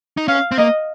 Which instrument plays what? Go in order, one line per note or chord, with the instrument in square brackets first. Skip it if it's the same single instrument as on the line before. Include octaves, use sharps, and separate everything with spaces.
[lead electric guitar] D#4
[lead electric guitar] C#4 [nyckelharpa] F5
[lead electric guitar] C4
[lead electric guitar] A#3 [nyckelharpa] D#5